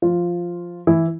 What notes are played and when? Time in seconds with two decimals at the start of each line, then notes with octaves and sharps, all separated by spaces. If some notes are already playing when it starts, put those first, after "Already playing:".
0.02 F3 F4
0.87 E3 E4